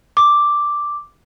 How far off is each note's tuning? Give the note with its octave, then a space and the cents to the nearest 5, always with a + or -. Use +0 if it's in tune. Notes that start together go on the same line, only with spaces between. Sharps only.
D6 +0